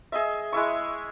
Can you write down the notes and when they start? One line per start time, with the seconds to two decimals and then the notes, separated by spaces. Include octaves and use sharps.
0.12 G#4 D#5 E5
0.53 G#3 E4 E5 C#6